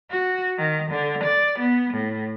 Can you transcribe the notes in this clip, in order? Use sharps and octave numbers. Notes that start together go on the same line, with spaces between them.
F#4
D#3
D3
D5
B3
A2